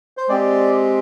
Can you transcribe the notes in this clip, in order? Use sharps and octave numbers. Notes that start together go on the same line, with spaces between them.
C5
G#3 C4 G4 D5